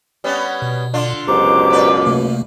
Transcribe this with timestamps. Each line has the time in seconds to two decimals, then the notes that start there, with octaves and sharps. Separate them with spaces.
0.24 G3 B3 C#4
0.62 B2
0.94 D3 D4 F4
1.28 C#2 F#2 B2 G4 C5 A#5 D6
1.70 A#2 B4 D5
2.05 C3 A3 A#3